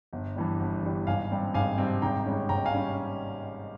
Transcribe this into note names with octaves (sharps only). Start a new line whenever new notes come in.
G1
G2 E3 G3
G1
G2 E3 G3
G#1 F5 G#5
G2 G3 C4
G#1 F5 G#5
G2 G3 C4
G#1 G5 A#5
G#2 G3 C#4
G#1 G5 A#5
F5 G#5
G3 C#4